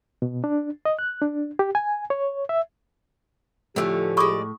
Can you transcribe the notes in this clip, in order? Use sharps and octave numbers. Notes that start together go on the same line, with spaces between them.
B2
D4
D#5
F#6
D4
G4
G#5
C#5
E5
A2 D3 F3 A3 C4 C#4 G4
G#3 D5 B5 C#6 D#6